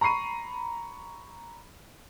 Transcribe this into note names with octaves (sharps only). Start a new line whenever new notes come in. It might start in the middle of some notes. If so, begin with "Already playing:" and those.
A#5 B5 C#6 C7 D#7